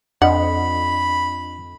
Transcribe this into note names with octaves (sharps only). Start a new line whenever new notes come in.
F2 D4 D#5 F#5 B5